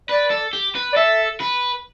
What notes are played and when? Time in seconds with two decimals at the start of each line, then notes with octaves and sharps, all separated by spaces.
0.09 B4 D5
0.31 A4
0.53 G4
0.75 B4
0.93 D5
0.96 A4 E5
1.40 B4